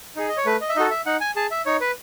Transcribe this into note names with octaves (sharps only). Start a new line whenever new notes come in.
D#4 G#4
D#5
C#5
A3 B4
D#5
E5
D#4 F#4 A4 D#5
E5
D#4 F#5
G#5
G#4 A5
E5
D#4 C#5
B4